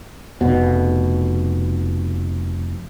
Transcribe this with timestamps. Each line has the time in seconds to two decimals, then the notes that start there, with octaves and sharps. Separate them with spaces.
0.41 F1 B2